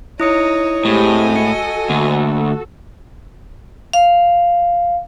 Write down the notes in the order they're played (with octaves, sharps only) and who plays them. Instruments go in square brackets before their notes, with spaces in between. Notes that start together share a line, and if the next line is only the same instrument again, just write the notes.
[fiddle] D#4 C#5 [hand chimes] E4 D#6 C#7
[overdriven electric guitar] A2 [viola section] G#3 C4 G4 [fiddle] D#5 G#5
[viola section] F#4 A4 [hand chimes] C#7
[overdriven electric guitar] D2 [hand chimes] A#3
[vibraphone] F5